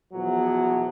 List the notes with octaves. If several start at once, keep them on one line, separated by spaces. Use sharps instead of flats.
E2 B2 F3 F#3